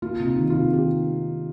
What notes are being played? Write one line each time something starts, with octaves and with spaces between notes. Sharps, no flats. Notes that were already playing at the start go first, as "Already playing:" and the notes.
A#3 F4
C3
D#4
D#3
F4
C3
D#3 G4